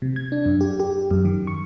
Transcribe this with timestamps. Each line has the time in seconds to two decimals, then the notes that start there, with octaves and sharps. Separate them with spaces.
0.02 C3
0.16 G#6
0.32 D4
0.46 F#2
0.61 G4
0.80 G4
1.11 F#2
1.25 D#3
1.47 C#6